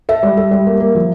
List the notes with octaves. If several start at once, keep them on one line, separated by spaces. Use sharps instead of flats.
A4 E5
G3
A4
G3
A#3
A#3
F3